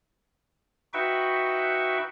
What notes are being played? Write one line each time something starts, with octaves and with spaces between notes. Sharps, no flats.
D#4 F#4 B4 E5 G5 C#6